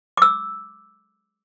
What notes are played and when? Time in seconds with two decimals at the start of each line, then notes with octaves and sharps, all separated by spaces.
0.17 D6 E6